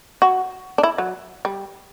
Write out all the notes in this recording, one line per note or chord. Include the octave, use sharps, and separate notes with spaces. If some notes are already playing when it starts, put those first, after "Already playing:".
F#4
D4
E4
F#3
G3